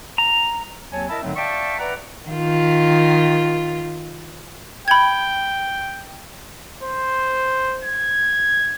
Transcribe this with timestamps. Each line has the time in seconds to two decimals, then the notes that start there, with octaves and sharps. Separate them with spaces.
0.18 A#5
0.92 D#2 F#3 C4 C#5 G#5 A5
1.09 E4 A#4 D#5 E5 A5 B5
1.23 G#2 D3 D#3 F#3 A3 C4
1.36 D5 E5 F5 G5 A5 C#6
1.79 B4 D5 E5 F#5 A#5
2.28 D#3 F4
4.88 G5 B5 G#6
6.83 C5
7.84 G#6